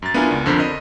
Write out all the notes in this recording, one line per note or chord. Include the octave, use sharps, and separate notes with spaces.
F#2 A6
B3 D4 E4 F4 A#4 G#5
C#2
F2 D3 A#4 C5 B6
D#5 B5